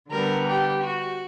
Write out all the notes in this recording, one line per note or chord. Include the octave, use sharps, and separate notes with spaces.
D3 G3 B3 A#4
G4
F#4